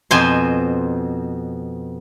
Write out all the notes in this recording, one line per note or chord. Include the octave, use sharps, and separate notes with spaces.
F2 B2 C5 G#5 C6